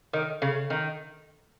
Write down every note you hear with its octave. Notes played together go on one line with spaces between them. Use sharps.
D#3
C#3
D#3